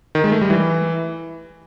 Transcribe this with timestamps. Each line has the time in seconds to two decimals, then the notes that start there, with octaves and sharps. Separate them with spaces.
0.15 D#3
0.24 G#3
0.32 A3
0.41 G3
0.50 E3